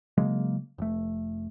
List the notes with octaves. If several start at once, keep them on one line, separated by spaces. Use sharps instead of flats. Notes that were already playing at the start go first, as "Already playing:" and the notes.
C#3 F#3 G#3 A#3
F1 A3